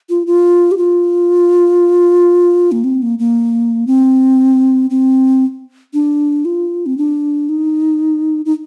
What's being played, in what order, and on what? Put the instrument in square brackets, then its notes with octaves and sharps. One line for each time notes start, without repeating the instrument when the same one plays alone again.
[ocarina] F4
F4
G4
F4
A#3
C4
A#3
A#3
C4
C4
D4
F4
C4
D4
D#4
D#4